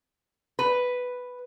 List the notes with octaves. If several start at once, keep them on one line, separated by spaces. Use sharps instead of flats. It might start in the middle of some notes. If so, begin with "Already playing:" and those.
B4